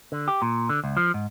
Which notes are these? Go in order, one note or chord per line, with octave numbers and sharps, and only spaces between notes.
D3
G4
A#2
D3
C#2
F3
G#2